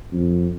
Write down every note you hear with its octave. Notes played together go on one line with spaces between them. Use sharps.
F2